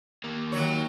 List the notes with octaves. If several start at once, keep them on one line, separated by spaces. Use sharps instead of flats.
D#2 A#3
D#3 F#3 C#5